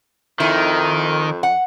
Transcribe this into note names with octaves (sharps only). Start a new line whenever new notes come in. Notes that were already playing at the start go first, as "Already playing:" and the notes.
F2 D#3 E4
F#5